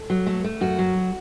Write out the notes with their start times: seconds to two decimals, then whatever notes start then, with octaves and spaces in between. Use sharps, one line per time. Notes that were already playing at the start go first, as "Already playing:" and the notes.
Already playing: A4
0.10 F#3
0.26 A3
0.44 A3
0.61 F#2 F#4
0.79 F#3